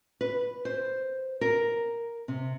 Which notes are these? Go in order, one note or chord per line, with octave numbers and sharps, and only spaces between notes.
B4
C5
A#4
C3